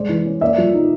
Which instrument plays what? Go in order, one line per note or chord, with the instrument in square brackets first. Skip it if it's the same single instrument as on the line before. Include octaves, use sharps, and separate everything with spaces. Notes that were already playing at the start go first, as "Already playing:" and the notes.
Already playing: [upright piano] G#3 C5 D5
E3
C#4
A#3 D5 E5
F3
D#4